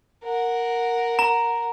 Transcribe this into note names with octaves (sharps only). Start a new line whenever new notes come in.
A#4 F#5
A#5